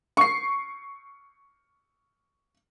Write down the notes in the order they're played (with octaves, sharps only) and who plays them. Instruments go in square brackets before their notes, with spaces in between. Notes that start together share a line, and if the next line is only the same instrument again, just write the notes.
[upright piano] C#6 C7